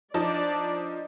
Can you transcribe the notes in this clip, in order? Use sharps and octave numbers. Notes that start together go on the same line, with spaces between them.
F3 D4 D#4 D5 A5